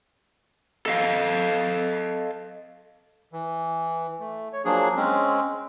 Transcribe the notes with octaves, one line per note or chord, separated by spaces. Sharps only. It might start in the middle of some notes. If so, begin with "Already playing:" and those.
A4 D#5 F5
E3
A3
C#5
F3 F#3 A#3 D4 G#4
G#3 C4 C#4